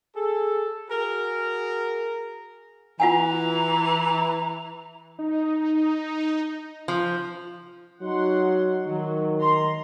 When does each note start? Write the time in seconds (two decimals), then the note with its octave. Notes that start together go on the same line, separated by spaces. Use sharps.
0.15 G#4 A4
0.90 F#4 G#4 A#4
3.00 E3 F4 F#5 G#5 A#5
5.19 D#4
6.88 F3
8.01 F#3 D#4 F#5 C6
8.85 D#3 F#3
9.40 A#5 C6